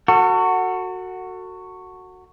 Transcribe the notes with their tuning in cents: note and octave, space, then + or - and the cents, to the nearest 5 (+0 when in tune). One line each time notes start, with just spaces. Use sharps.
F#4 +0 A4 +40